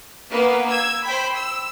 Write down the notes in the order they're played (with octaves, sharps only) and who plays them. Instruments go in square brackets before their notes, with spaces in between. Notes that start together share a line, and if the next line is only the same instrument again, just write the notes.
[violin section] A#3 B3 B4
E6 G#6
C5 G5 B5
E6